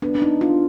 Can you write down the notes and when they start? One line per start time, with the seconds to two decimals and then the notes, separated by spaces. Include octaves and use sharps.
0.02 B3 D4
0.15 D4
0.22 D#4
0.41 D4 F4